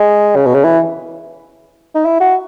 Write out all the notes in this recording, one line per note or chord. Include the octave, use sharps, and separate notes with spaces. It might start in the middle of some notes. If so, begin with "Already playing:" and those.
Already playing: G#3
C#3
B2
C#3
E3
D#4
E4
F#4